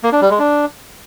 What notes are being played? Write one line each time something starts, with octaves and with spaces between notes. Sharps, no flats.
A#3
D4
G3
G#3
D4